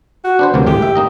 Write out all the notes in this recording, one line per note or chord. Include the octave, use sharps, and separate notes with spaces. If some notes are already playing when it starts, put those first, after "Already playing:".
F#4
D4 B4 C5
D2 C3 F#3 A#3
G#1 A2 G#3 G4
E5
A#3 D#4 D#5